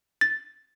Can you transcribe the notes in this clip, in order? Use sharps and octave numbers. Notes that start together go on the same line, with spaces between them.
A6